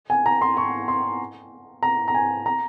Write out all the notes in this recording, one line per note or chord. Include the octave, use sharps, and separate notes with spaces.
G#5
A#5
C6
C#6
C6
A#5
A#5
G#5
A#5